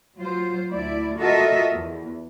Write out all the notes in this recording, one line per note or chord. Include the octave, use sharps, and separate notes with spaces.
F#3 F4 C5
D2 E4 D5
F4 F#4 A4 A#4 D#5 E5
E2